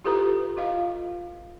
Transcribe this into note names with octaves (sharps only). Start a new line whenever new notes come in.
E4 F4 G4 A4 B4 A#5
F4 D#5 F5